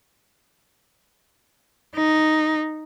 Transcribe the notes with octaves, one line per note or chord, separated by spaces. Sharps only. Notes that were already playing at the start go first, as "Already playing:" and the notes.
D#4